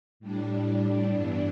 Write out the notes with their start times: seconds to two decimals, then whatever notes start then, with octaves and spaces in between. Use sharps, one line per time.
0.20 A2 G3 D4
1.10 G2 E3 B3 D4